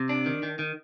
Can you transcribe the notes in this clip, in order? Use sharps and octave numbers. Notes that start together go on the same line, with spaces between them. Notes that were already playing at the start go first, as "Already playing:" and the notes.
Already playing: C3
D4
D#3
D#3
D#3